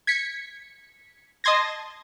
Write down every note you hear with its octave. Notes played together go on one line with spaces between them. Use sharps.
G#6 B6 C#7
D#5 A5 C6 G#6 A#6